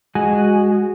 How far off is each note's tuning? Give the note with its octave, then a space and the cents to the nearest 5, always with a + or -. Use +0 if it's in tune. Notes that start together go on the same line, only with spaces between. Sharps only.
G#3 -15 F#4 +0 G#5 +0